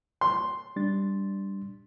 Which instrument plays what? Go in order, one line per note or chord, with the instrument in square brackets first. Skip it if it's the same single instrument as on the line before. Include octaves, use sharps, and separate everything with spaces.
[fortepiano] C6
[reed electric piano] G3 D4 A6